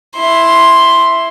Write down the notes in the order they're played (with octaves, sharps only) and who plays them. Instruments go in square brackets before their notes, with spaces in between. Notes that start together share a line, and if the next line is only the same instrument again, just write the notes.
[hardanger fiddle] E4 C6